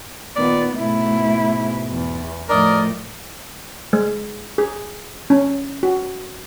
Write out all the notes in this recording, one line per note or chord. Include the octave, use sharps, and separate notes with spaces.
A#2 D#3 B3 D5
G#2 B2 A3 E4
E2
A2 F3 A#4 D5 D#5
G#3
G#4
C#4
F#4